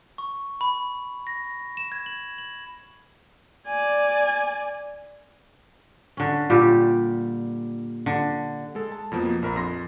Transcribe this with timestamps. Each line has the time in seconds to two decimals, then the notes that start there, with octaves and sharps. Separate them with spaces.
0.18 C#6
0.61 B5
1.27 A#6
1.77 E7
1.92 G#6
2.06 F#7
2.38 F#7
3.67 D5 G#5
6.17 D3 C#4
6.50 A#2 G3 G4
8.06 D3
8.75 G#3 A4
8.92 A5
9.12 F2 B2 F3 A#3
9.42 A#1 A#4 B5
9.56 F2 C6 A#6